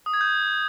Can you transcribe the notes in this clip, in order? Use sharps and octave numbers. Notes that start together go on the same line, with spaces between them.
D#6
G#6
G6